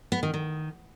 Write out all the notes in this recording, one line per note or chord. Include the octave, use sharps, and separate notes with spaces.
B3
D#3
D#3